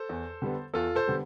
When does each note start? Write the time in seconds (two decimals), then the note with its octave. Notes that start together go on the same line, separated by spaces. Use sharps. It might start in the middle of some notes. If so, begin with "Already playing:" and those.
Already playing: A4 C5
0.09 E2
0.42 D3 G3 B3
0.74 E2 F4 A4
0.95 A4 C5
1.07 D3 G3 B3